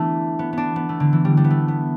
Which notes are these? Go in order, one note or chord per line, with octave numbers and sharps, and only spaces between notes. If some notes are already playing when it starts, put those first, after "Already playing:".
Already playing: E3 A3 B3 D4
B3
B3 D4
B3
A3
D3
E3
G3
G3
B3
A3
B3